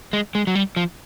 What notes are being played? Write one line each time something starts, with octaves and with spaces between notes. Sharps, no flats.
G#3
G#3
F#3
G3
F3